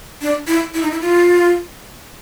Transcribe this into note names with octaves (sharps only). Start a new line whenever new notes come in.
D4
E4
E4
D#4
E4
F4